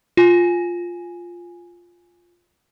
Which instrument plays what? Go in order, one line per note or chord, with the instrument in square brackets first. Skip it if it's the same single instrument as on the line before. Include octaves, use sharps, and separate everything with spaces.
[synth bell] F4 G#5